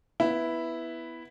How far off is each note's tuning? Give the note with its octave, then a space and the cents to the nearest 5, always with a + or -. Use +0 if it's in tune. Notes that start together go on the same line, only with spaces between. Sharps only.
B3 +0 E4 +0